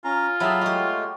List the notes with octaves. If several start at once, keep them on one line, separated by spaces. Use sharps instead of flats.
C#4 F4 A#5
F#3 G4 G#4 E5 A5 B5
G#3 A3 F#4 G4